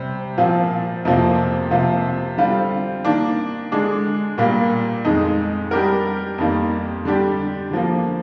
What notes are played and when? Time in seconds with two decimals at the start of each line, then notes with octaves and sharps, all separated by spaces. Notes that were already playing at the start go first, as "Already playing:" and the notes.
Already playing: C3 G3 C4
0.38 A#2 F3 C4 F4
1.05 F2 C3 F3 A#3
1.71 C3 F3 A#3 F4
2.38 D3 G3 C4 F4
3.05 D#3 A#3 D4
3.72 D3 G#3 D4
4.38 A#2 G3 A#3
5.05 F2 D#3 G#3 D#4
5.71 G3 D4 G4 A#4
6.38 F2 D#3 G3 A#3
7.05 D3 G3 D4 G4
7.71 D3 F3 A#3